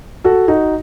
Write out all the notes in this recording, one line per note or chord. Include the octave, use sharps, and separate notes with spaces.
F#4 A4
D#4 F#4